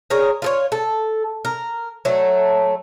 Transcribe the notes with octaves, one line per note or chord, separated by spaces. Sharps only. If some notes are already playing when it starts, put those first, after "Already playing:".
G#4 A#4 C#5
F4 A4 C#5
A4
A#4
F#3 A3